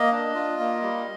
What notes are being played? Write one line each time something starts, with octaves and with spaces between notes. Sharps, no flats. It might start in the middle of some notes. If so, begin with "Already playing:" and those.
Already playing: A#3 D#5
D4
F4
A#3
G3